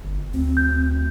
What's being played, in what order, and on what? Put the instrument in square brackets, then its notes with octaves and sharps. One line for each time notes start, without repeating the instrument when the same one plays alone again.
[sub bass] G1
[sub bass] D2 [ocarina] C4
[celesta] G6